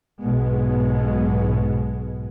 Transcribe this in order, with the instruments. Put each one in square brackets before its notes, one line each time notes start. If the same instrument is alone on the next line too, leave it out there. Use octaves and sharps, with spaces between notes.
[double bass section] B1 G#2 B2 G#3 B3